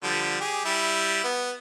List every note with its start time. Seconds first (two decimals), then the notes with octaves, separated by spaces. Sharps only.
0.03 D3 F3 G3
0.40 G4 G#4
0.65 G3 E4
1.24 B3